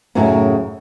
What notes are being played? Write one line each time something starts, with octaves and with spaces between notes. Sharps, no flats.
F#2 A2 C#3 C#4 D#4 F#4